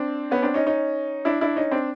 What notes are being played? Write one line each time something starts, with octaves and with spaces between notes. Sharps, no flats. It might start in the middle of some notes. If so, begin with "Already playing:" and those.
Already playing: C4 D4
B3 C#4
C4 D4
C#4 D#4
C#4 D#4
D4 E4
D4 E4
C#4 D#4
C4 D4